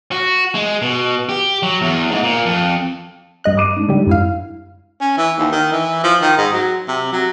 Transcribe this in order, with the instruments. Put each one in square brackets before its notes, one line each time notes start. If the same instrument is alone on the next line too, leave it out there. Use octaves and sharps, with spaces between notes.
[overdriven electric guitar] F#4
G#3
B2
G4
F#3
E2
G#2
A#2
F2
[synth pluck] G2 D#5 F#6
[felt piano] D6 D#7
G#2 D4
[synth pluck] D3 G3
F#2 E4 F5
[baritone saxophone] C#4
E3
D#2
D#3
E3
F3
D#3
G#2
F#3
C3
F#3